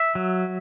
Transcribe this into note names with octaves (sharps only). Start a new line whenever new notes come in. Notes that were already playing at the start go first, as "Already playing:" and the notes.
Already playing: E5
F#3